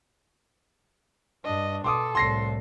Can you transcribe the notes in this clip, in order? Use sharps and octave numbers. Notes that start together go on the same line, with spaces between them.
G2 D4 D#5
B2 A4 C6 D6 D#6
C2 A2 C6 A#6 C7